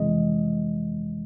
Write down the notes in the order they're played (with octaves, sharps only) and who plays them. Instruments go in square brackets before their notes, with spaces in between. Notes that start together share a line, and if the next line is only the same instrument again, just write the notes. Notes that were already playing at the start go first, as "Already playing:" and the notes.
Already playing: [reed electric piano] F2 C3 E3 G#3 D#5